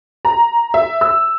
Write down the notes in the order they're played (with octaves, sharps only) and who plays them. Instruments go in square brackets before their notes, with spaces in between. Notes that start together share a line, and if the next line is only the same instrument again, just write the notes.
[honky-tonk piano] A#5
E5
E6